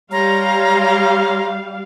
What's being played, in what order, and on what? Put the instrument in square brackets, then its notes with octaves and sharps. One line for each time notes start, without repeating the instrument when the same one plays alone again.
[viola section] G3 F5 [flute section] C#5 A#5 C6